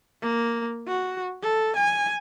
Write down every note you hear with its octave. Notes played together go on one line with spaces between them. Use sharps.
A#3
F#4
A4
G#5